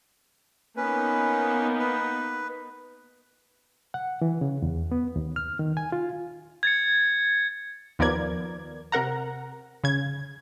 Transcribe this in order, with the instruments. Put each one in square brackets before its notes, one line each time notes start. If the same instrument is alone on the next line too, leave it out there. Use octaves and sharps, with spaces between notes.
[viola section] A#3 B3 D#4 [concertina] C#4 B4
[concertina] B4
[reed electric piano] F#5
E3
C#3
E2
B3
D#2
F6
D#3
G#5
F4
[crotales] G#6 A6 C#7
[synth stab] D#2 F3 B3 A#4 D5 G#6
C3 A#4 F#5 A#5
C#3 G#6